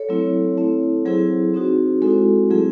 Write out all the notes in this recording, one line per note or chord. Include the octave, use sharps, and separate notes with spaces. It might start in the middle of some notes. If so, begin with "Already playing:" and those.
Already playing: A4 C#5
F#3 A3 C4 E4
A3 C4 E4
F#3 C4 E4 G#4 C5
C4 D#4 F#4
G#3 C4 E4 F#4 A4
F#3 A3 C4 E4 G#4